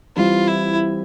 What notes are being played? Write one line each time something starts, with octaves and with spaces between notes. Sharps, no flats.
E3 G3 C4 F4
E4